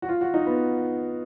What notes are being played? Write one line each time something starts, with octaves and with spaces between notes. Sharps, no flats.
F#4
F4
F#4
D#4
B3